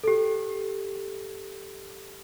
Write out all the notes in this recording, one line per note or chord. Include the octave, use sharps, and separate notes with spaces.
G4 A4